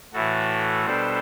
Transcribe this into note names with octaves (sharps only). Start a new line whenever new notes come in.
A2 E3 A3 F#4 A4
B2 G3 D4 A4 C5